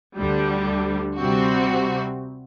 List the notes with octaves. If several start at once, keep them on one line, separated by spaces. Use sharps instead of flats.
D2 D3 G3
C3 G3 C4 F#4